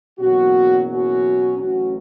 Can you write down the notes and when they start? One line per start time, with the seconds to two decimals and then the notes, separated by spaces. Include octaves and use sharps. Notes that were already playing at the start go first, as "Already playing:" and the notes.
0.19 F#1 E2 B2 F#3 C#4 F#4
0.89 C#4 F#4
1.58 A1 A2 F#3 C#4 F#4